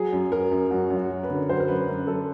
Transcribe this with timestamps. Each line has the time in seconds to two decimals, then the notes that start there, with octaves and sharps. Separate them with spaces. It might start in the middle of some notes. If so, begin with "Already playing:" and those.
Already playing: F#3 G#4
0.13 F#2
0.32 F#3 A#4
0.51 F#2
0.71 F#2 F#4
0.90 F#2
0.97 F#4
1.10 F#3
1.23 B4
1.30 D3
1.49 F#3 C5
1.59 A#4
1.68 F#2 B4
1.88 F#2
2.07 F#2 A4